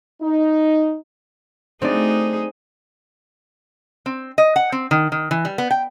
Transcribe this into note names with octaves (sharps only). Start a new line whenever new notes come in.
D#4
F#3 A3 C4 D4 D#4 G#4 D5
C4
D#5
F#5
C4
D#3
D#3
E3
G3
B3
G5